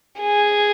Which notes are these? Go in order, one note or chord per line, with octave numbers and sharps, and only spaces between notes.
G#4